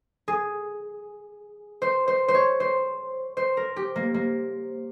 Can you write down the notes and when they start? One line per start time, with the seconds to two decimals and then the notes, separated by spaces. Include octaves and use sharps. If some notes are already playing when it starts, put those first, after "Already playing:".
0.28 G#4
1.82 C5
2.08 C5
2.28 C5
2.35 C#5
2.60 C5
3.37 C5
3.57 A#4
3.76 G4
3.96 A#3
4.14 A#3